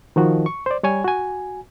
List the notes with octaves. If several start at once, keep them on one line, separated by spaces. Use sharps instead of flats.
D#3 F3 F#4
C#6
C5 D5
G3 C#5 G#5 G#6
F#4 G#5